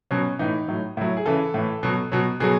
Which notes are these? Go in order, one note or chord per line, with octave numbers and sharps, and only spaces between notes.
B2 F#3 C#4
A2 E3 D#4
A2 F#3
A2 F#3 E4
G#4
C#3 E3 A4
A2 E3
B2 F#3
B2 F#3
B2 F#3 G#4